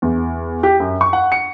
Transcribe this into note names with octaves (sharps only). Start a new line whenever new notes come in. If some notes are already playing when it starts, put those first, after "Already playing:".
E2
G4
F#2
C#6
F#5
C#7